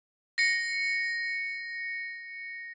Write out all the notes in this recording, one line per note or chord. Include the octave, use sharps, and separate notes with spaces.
A#6 C#7